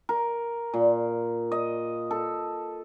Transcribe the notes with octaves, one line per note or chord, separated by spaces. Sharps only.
A#4
A#2
D#5
A4